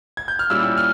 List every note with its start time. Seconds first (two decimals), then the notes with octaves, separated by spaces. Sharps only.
0.17 G#6
0.28 G6
0.39 F6
0.50 A#2 G3 C#4 E4 E6
0.77 F6